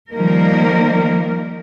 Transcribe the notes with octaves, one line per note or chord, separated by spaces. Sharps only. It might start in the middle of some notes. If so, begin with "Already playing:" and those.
D#3 F3 G3 A#3 D#4 A#4